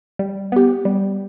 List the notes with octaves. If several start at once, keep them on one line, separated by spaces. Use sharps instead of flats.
G3
B3 G4
G3